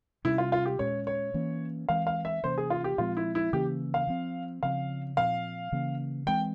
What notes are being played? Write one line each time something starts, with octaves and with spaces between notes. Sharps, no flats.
C3 G3 C#4 E4
F4
F4
G4
A#2 G#3 C#4 C#5
C#5
E3 A#3 C#4
E3 G#3 C4 F5
F5
E5
C3 E3 A#3 C#4 C5
G#4
F4
G4
A#2 F3 G#3 C4 F4
E4
E4
C#3 E3 A#3 C#4 G4
F5
F3 C4
C#3 F3 C4 F5
A#2 F3 C4 F5
C#3 E3 A#3 C#4
E3 G#3 C4 G5